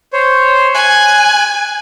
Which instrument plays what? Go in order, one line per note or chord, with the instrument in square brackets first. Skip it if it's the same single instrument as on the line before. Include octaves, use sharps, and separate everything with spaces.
[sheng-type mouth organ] C5 C#5
[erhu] G#5 [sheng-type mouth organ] F#6